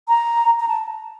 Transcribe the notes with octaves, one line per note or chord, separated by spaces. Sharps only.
A#5
A#5
A5